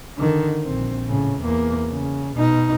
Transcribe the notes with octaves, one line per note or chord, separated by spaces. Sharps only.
D3 D#3
A#1 C4
A2 C#3
E2 A#3
C#3
B2 D#4